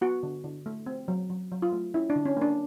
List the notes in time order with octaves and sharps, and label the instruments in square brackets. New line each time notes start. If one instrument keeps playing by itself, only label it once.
[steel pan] B3 F#4
D3
D3
A3
C4
F#3
F#3
F#3
F4
A3
C#4 E4
D4
D3
C#4
A#3 D4